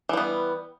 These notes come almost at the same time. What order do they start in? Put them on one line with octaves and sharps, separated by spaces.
E3 G3 B3